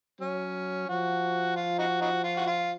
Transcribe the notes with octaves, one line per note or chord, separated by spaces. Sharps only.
F#3 C#4
F3 F#4
F4
D#4 F#4
D#4 F#4
F4
F#4
F4